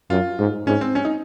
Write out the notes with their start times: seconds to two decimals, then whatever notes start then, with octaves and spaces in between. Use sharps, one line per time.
0.10 F#2 F4
0.39 G#2
0.67 G#2 C#4
0.81 C4
0.95 C#4
1.05 D#4